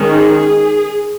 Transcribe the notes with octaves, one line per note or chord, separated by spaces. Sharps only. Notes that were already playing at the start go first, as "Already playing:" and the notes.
Already playing: D#3 G#3 C#4
G#4